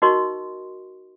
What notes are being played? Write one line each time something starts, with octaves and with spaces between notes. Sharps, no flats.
D#4 F#4 A#4 D#5 C6 C#6